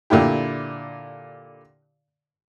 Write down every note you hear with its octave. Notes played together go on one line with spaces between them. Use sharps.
A#2 D3 E4 G4